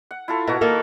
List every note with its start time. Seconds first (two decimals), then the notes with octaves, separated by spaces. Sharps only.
0.11 F#5
0.28 E4 F4 A4
0.47 B2 F#4 A#4 A#5
0.61 D#3 A#3 A4